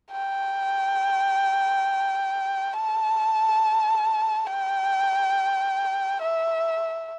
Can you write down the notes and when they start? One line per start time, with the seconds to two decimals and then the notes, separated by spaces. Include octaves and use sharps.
0.11 G5
2.74 A5
4.47 G5
6.22 E5